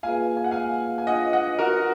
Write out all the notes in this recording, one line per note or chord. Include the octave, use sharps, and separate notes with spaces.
A#3 F4 G#4 B4 F5 G#5
G#5
F#5
F5 G#5
G#5
D4 F4 B4 D#5 F#5
D#5 F#5
F#4 A#4